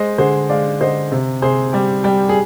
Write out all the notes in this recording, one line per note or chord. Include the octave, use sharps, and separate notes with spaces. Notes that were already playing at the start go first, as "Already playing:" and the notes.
Already playing: G#3 C5 D#5
D3 G#4 C5
G#3 D5 F5
D3 C5 D#5
C3
C3 G#4 C5
G3 G4
G3 G4
G#4